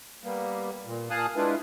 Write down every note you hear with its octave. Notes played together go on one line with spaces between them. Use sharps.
G3 A#3 B3
A#2
A#2 F5 G#5 A5 D#6 F#6
G#3 D4 E4 F4 B4